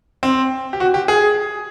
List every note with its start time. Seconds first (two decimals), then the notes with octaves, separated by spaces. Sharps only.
0.23 C4
0.73 G4
0.80 F#4
0.94 G4
1.08 G#4